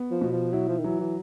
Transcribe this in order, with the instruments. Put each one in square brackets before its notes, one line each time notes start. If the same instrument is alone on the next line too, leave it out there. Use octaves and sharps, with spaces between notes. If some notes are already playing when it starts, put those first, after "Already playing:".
Already playing: [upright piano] B3
[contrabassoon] F3
[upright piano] B2
[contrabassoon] F3
[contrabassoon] F#3 [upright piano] E4
[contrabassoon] F3
D#3
[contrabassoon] E3 [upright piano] F#3
[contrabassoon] E3